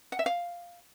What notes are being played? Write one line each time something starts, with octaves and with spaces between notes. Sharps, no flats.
F#5
E5
F5